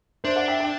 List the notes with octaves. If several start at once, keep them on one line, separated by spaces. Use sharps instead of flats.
D4 C5 E5
D5 F#5
E5 G5
E5 G5